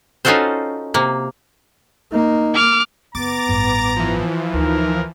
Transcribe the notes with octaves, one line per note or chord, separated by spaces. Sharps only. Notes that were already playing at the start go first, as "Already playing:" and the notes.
C#4 D#4 F4 F#4 A4 C5
C3 A#3
A#3 D#4
D6 F6
F#1 B3 A#5 D6 A6
A1 G2
E3 F3
D2 D#4 A#4